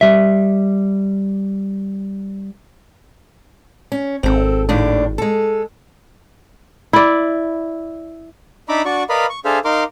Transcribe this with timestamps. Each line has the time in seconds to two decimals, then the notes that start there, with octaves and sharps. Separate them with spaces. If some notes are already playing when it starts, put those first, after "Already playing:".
0.01 G3 E5
3.92 C#4
4.23 G#1 C4 A4
4.69 D#2 A2 D4
5.18 G#3 A4
6.93 E4 D5
8.69 D4 D#4 E5 A#5 B5 D6
8.85 D4 F#4 D5 C#6
9.09 A#4 B4 D5 D#5 F5 B5
9.30 C#6
9.45 D4 G#4 A4 C5 E5 F5
9.65 D#4 A#4 F5 C6 D6